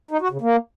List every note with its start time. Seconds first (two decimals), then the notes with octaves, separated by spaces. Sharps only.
0.11 D#4
0.21 F#4
0.31 C#3
0.41 A#3